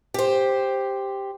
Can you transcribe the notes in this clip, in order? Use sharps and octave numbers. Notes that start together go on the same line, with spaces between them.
G4 C5